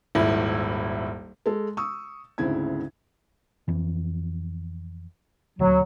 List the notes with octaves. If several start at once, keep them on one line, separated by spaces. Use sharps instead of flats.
D#1 G#1 E4
G#3 A4
C#6 D#6 E6
D2 G#2 C#3 C4 E4 G#6
F2 E3
D#1 D2 F#3